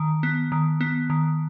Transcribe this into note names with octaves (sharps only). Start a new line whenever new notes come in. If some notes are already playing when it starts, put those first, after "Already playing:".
Already playing: D#3
B3
D#3
B3
D#3